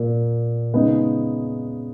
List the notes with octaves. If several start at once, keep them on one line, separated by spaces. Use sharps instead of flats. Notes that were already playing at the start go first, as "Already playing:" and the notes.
Already playing: A#2 A#3
C#3 G#3 B3 D#4